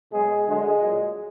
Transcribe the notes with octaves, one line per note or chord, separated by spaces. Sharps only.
B2 F#3 G#3 G#4
D3 F#3 G#3 G#4
A#2 F#3